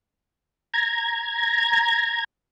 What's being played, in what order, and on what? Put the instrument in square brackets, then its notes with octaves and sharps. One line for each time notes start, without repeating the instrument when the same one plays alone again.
[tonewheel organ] A#5 G#6